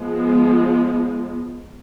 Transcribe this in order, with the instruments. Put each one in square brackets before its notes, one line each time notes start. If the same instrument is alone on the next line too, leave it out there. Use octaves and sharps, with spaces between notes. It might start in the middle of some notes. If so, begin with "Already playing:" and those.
Already playing: [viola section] F3 G#3 B3